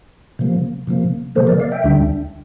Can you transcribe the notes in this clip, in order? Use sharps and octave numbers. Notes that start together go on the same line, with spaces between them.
C3 F3 A#3
C3 F3 A#3
C3 F3 A#3 A4 C5
A#4 D5
D5 F5
E5 G5
D2 D3 G3 D4